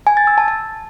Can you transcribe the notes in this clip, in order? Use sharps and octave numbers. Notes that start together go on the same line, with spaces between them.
G#5
A6
E6
A5
A5